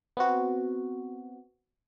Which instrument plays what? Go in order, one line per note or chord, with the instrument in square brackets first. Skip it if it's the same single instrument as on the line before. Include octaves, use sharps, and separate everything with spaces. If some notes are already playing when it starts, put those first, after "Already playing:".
[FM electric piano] B3 C4 F#4